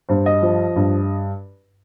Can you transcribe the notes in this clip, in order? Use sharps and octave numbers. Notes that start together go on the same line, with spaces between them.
G2 C5
D#5
F3
G2